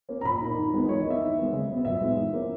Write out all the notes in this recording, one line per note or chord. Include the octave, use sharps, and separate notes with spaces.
A#3 C#4
A#5
A#2 B5
A#3 D#4
D#3
G#3 B3 D#4
E3 C#5
D#5
A#3 D#4 E5
D#3
G#3 B3
C#3
F#3 B3
A#2 E5
G#3 B3 D#4
E3
A#3 C#4